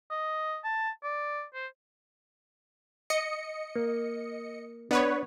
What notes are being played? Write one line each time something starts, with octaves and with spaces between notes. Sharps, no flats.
D#5
A5
D5
C5
D#5 C#7
A#3
B3 D4 B4 C#5